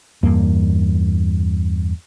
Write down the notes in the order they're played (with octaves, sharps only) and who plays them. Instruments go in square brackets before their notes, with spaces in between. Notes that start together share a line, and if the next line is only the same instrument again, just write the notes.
[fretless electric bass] E2 G2 A#3